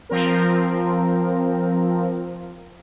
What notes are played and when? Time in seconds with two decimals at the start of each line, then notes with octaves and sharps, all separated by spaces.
0.09 F3 C4 A#4